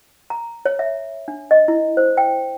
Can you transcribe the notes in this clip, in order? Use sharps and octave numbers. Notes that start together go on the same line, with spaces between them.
A#5
C#5
E5
D4
D#5
E4
C5
G5